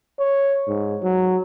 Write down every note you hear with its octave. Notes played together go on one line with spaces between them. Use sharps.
C#5
G#2
F#3